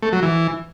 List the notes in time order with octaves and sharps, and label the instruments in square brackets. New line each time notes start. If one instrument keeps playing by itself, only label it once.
[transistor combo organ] A3
F#3
E3